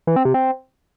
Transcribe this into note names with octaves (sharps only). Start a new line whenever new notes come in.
E3
C4
C3
C4